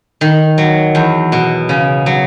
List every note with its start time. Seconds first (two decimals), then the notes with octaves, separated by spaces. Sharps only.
0.21 D#3
0.58 F#3
0.95 E2
1.32 B2
1.69 C#3
2.06 F#3